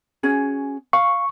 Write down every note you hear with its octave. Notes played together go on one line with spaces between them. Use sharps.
C#4 F#4 G#4
F5 C#6